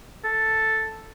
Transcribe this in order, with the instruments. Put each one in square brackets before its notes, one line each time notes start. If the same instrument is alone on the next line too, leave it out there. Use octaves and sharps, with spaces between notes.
[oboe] A4